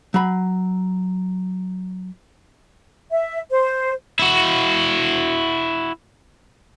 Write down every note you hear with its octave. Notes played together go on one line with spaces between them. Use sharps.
F#3 B5
E5
C5
E4 F#4